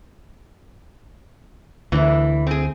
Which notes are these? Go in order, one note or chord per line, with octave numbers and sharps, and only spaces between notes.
D2 E3 E4
C4 G#4